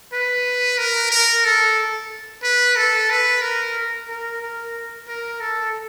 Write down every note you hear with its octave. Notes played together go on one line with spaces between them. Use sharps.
B4
A#4
A#4
A4
B4
A4
B4
A#4
A#4
A#4
A#4
A4